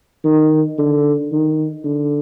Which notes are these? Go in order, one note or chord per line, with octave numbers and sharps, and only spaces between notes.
D#3
D3
D#3
D3